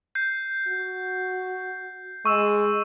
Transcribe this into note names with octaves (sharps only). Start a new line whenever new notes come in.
G6 C7
F#4
G#3 C#6 E6 E7